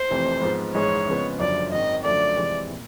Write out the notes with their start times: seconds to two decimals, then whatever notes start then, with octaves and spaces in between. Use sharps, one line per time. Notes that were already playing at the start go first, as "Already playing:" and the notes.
Already playing: C5
0.10 F1 F2 C3 E3 A3
0.42 G#2 F3 G#3 B3
0.75 A#1 G#2 E3 G#3 C#5
1.07 F2 C#3 F3 G#3 B3
1.39 F#1 F#2 D3 F3 D5
1.72 G#1 G#2 D#3 D#5
2.04 F#2 D3 F3 A3 D5
2.37 F2 C3 E3 G#3 C4
2.71 A#2